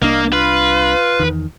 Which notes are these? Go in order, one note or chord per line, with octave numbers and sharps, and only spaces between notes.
C2 A#3 D4 D#5 F5
F4 B4 F5
E2 D#3